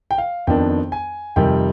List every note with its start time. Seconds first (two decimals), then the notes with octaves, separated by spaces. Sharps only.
0.11 G5
0.18 F5
0.47 F2 D#3 B3 D4 G5
0.92 G#5
1.36 F2 C3 D#3 G3 G5